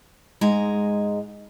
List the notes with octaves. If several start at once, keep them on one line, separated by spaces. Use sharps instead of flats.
G#2 G#3 G#5 A#5